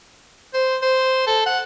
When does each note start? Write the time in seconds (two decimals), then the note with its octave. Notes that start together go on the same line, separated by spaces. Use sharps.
0.54 C5
0.82 C5
1.27 A4
1.46 F#5